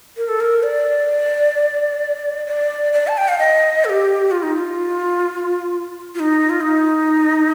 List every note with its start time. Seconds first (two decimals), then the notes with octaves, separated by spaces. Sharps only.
0.17 A#4
0.28 A4
0.40 A#4
0.63 D5
2.46 D5
2.93 D5
3.08 A5
3.18 G5
3.28 F5
3.39 D#5
3.85 A4
3.90 G4
4.31 F4
4.43 D#4
4.55 F4
6.15 F4
6.19 D#4
6.50 F4
6.61 D#4